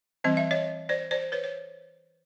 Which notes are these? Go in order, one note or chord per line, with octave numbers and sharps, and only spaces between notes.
E3 G3 C4 D#5
E5
C#5 D#5
C5 D5
C5 D5
B4 C#5
C#5